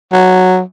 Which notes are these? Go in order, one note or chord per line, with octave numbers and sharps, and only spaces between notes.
F#3